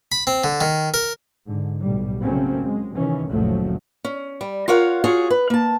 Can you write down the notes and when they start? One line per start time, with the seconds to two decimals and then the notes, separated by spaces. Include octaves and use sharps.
0.12 B5
0.27 C4
0.44 D3
0.61 D#3
0.94 A#4
1.46 G#2 D3
1.80 B1 A2 G3
2.21 C#3 F#3 A3 A#3 C4 C#4
2.62 G#3
2.95 C3 D#3 E3 C#4
3.30 F#1 D2 A#2 F3 F#3 A3
4.04 C#4
4.41 G3
4.68 F4 A#4 C#5 F5 F#5
5.04 F4 F#4 G#4 C#5
5.30 B4
5.50 A#3 A5